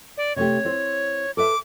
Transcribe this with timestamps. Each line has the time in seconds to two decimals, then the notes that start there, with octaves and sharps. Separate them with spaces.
0.17 D5
0.36 C3 A3 G4 C#5
0.65 C4 E4 C5
1.37 A4 B4 E5 D6